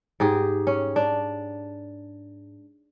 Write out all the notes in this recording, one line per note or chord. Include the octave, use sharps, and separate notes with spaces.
G#2 G4 G#4
C#4
D4